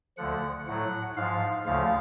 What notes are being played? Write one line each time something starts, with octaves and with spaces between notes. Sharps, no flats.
D2 D3 F3 F#5
A2 F#3 F#5
G#2 F3 F5
D2 C#3 F3 F5